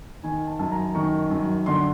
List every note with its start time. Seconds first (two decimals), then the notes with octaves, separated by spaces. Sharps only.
0.23 D#3 G#5
0.47 A5
0.59 F#2 A5
0.71 A#5
0.95 D#3 C#6
1.31 F#2
1.66 D3 C6